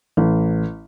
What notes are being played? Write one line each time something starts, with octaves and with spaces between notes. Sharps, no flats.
A1